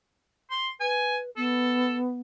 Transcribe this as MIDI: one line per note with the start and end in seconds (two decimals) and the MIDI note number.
0.51 0.69 84
0.80 1.30 71
0.80 1.16 80
1.37 2.21 59
1.37 1.96 69